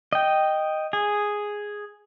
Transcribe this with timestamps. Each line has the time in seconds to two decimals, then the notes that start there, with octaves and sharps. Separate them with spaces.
0.13 D#5 G5
0.93 G#4